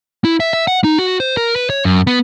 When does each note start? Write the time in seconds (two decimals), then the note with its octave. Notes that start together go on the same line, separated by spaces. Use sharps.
0.24 E4
0.40 E5
0.53 E5
0.67 F#5
0.84 D#4
0.98 F#4
1.20 C5
1.37 A#4
1.56 B4
1.70 C#5
1.85 F#2
2.07 B3